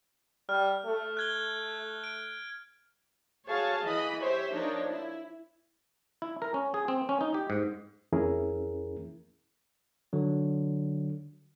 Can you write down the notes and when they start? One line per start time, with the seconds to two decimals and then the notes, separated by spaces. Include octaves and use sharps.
0.49 G3 F6
0.86 A3
1.17 F#6 G#6 G7
2.04 D7
3.47 F#4 G#4 C#5 F5 A5
3.83 E3 D#5 B5
4.18 G4 C5 C#5 E5
4.52 F3 D4 D#4 A#4 C#5
4.90 E4
6.22 E4
6.42 A#4
6.54 C#4
6.74 G#4
6.88 C4
7.09 C#4
7.21 D#4
7.34 G4
7.50 G#2
8.12 F2 E3 C#4 E4 G#4 A#4
10.13 D3 F#3